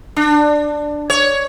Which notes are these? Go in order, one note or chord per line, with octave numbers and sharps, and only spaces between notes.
D4
C#5